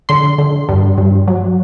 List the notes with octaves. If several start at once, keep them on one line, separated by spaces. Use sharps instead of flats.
D3 C6
D3
G2
G2
F#3